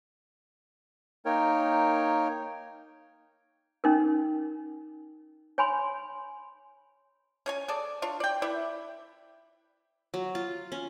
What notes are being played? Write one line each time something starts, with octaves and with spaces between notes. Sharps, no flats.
A#3 D#4 A#4 C#5 G5
C#4 D#4 A#4
C#5 G#5 B5 C6
C#4 C#5 G#5
G#4 A4 D5
D4 F4 C#5
D5 G5
E4 B4 D5 E5
F#3
F4
C#4